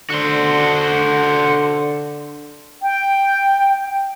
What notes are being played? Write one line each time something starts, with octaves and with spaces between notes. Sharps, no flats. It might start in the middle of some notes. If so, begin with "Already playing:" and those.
D3 F#4 C5
G5